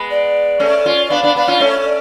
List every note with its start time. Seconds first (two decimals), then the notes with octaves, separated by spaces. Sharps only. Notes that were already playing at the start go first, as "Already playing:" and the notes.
Already playing: G#3 B3
0.10 D5
0.60 A3 C#4
0.86 C#4 F4
1.06 D5
1.10 B3 D4 F5
1.23 B3 D4
1.35 B3 D4 F5
1.48 C#4 F4
1.60 A3 C#4 C#5
1.86 D5